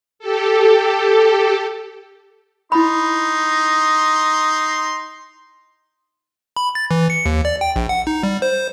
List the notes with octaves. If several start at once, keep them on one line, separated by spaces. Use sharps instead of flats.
G4 A4
D#4 E4 B5 C6
B5
A6
E3
C#7
D#2
D5
G5
A#1
F#5
D#4
G3
C5